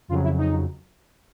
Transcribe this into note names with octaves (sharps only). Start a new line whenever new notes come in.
F2 C#3 F#3 F4
E4
D#4